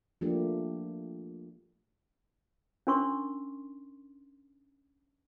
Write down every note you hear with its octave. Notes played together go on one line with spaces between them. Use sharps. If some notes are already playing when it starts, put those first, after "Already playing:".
F3 A3 A#3 D4 G4
C#4 D4 A#4 C6 C#6